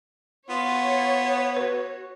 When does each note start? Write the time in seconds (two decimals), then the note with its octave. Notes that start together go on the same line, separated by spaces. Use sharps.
0.49 B3 F4 C#5
1.57 F#4 B4